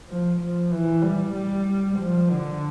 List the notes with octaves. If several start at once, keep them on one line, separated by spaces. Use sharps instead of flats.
F3
F3
E3
G3
G3
F3
D3